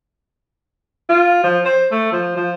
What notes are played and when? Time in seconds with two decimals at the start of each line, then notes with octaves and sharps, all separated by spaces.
1.09 F4
1.44 F3
1.65 C5
1.92 A3
2.12 F3
2.37 F3